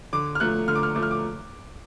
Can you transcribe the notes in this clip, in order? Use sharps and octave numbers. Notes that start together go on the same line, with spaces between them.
D3 D6
F6
F3 A3 F#6
D3 F6
D6
F6
F3 A3 D6
F6
D6